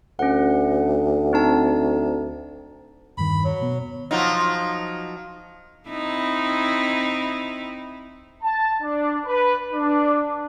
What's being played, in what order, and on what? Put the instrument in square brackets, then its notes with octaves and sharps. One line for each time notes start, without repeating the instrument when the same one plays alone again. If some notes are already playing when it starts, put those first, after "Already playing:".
[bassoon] D2 [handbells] C#4 F#5
[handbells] C4 D#4 A5
[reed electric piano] E2 G2 D#3 [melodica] B5
[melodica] F#3
[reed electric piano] B2 B3
[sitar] F3 F#3 D#4
[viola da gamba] C4 D#4 E4
[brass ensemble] A5
D4
B4
D4